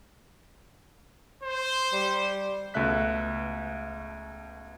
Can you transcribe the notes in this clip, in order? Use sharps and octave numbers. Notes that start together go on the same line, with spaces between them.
C5
G3
C#2 B2 A3 E5 F#6 B6